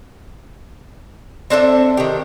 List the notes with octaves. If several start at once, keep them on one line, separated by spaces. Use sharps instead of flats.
C4 D4 A4 E5
D#3 G4